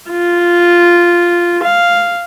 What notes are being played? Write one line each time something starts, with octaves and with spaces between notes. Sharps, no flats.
F4
F5